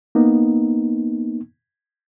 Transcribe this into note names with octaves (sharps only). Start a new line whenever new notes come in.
A#3 B3 D#4